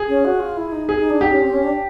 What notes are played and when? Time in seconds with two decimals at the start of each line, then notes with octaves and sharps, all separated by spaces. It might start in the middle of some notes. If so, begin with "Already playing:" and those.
Already playing: G#4
0.08 C#4
0.25 F#4
0.40 F4
0.57 E4
0.72 D#4
0.89 G#4
0.99 D#4
1.10 D4
1.20 D#4 G4
1.32 C#4
1.42 C4
1.53 C#4
1.64 D4